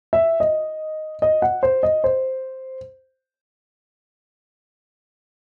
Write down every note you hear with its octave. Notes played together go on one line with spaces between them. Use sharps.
E5
D#5
D#5
F#5
C5
D#5
C5